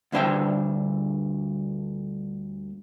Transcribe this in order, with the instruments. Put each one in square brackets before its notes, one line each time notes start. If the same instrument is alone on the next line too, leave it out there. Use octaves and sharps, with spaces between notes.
[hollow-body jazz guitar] D2 G2 D4 C5 E5 G5